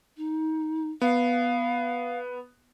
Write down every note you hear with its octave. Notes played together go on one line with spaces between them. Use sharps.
D#4
B3 F5